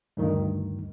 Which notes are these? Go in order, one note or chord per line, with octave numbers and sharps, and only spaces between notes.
D2 G2 D#3